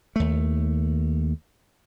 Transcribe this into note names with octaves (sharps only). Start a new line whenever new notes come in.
D#2 A3